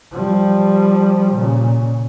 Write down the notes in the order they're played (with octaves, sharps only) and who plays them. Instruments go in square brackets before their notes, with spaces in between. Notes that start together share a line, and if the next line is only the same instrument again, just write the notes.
[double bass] F3 G3
A#2 C#3